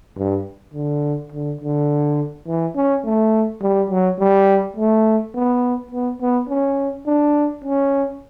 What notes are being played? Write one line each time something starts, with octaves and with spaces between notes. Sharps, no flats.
G2
D3
D3
D3
E3
C#4
A3
G3
F#3
G3
A3
B3
B3
B3
C#4
D4
C#4